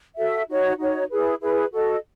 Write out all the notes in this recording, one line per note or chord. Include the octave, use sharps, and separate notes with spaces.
F#4 A4 E5
D#4 F#4 C#5
D#4 F#4 C#5
E4 G#4 B4
E4 G#4 B4
F#4 A4 D#5